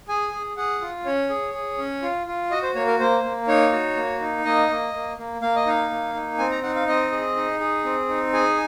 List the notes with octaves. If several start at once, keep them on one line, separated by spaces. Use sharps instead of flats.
G#4 G#5
G#4
G#4 F#5
F4
C#4 C#5
G#4
G#4
C#4
F4
F4
F#4 D#5
C5
A#3 C#5
A#4
A#3 C5
A#3
D#4 C#5
F#4
A#3
D#4
A#3 D#5
A#3
A#3
A#3
A#3 F5
D#5
D#4 F5
A#3
D#4
C4 G#5
A#5
D#4 F#5
F5
C4 D#5
G#4
D#4
G#4
C4
D#4
G#4 G#5